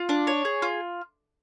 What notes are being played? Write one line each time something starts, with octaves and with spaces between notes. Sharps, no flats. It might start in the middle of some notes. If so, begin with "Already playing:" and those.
Already playing: F4
D4
C#5
G#4
F4